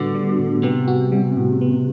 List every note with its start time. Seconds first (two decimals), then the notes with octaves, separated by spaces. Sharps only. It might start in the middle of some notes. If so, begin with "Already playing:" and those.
Already playing: A2 D3 G3 B3 F#4
0.14 G3
0.39 A2
0.63 C3 B3
0.88 F#4
1.12 G3
1.37 A2
1.61 B3